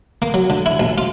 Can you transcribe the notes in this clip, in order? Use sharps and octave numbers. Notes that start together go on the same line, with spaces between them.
A#3
F#3
D3
E4
A#1
F4